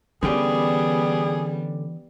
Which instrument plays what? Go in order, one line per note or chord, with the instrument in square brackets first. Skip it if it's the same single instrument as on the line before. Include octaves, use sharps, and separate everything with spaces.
[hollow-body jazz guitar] D3 C#4 G4 [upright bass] E3 [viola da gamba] G3 B3 [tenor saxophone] G#4